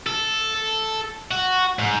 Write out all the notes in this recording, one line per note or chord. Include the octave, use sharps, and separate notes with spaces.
A4
F#4
G#2